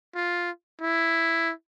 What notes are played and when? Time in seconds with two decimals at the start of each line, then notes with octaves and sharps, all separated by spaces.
0.15 F4
0.81 E4